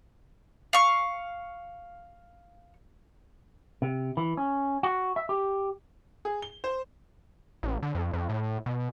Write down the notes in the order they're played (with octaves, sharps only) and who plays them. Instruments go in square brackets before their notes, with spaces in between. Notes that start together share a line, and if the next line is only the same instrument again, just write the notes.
[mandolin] F5 C#6
[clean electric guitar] C3
E3
C#4
F#4
E5
G4
[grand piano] G#4
G7
C5
[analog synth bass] A1
D3
F2
F2
A2
B2